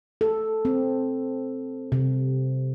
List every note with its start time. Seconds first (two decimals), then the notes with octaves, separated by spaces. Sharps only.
0.21 A4
0.65 C4
1.92 C3